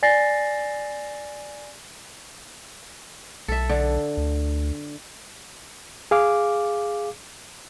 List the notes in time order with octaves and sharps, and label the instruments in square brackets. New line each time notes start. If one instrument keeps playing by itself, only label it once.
[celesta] D5 G#5 A6 A#6 C7
[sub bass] B1 [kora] A4 E5
[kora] D3
[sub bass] D2
[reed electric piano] G#4 F5 D6